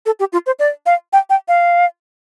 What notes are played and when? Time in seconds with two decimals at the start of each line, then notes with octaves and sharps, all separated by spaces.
0.06 A4
0.19 G4
0.33 F4
0.46 C5
0.59 D5
0.86 F5
1.13 G5
1.30 G5
1.48 F5